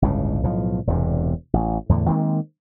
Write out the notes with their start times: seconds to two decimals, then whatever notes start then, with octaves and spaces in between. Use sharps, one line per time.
0.02 G1 C#2 A2 C#3
0.43 B1 A2 F3
0.87 E1 E2 G2 C3
1.53 A1
1.89 E2 A2 D3
2.08 D#3 G#3 A#3 C4